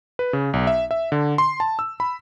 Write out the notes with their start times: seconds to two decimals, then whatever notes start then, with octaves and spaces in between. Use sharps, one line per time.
0.19 B4
0.33 C#3
0.53 B1
0.67 E5
0.91 E5
1.12 D3
1.38 C6
1.60 A5
1.79 E6
2.00 B5